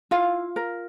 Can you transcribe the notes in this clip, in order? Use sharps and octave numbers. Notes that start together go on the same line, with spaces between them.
E4 F4 F5
A#4